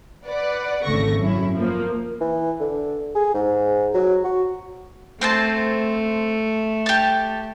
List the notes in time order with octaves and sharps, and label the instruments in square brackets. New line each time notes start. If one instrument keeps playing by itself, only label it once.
[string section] B4 D5 F#5
G#1 D2 C#3 A3 C#6 A#6
F#2 C#4 E4
F3 A#3
[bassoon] E3
D3
G#4
G#2
F#3
F#4
[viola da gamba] A3 [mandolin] C4 C5 A5
[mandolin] G4 A5